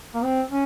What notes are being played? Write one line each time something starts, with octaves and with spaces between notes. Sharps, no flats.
A#3
C4
C#4